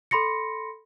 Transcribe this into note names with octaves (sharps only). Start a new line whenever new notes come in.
A4 B5 C6 A#6 C#7